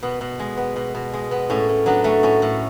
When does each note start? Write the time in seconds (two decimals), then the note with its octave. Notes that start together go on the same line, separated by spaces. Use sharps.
0.03 B2 B3
0.21 B2
0.39 G#3
0.57 B3
0.76 B2
0.95 B2
1.14 G#3
1.31 B3
1.50 A2 C#4
1.69 A2
1.86 F#3 B3 D4
2.04 A3 C#4
2.23 A2 C#4
2.42 A2